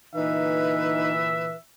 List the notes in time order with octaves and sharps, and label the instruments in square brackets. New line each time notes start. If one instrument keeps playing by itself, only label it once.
[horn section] A#2 D3 E3 [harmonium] D#4 [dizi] B4 [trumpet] E5